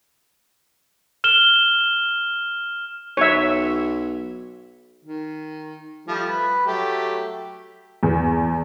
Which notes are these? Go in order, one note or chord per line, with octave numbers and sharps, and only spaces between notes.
F6 E7 G7
B1 C#5 E5
D#3
F3 G3 A3
B4
F#3 A3 G4
E2